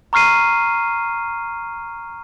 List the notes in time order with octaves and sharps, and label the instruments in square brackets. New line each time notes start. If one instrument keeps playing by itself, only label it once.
[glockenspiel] A#5 C#6 F6 C7 D#7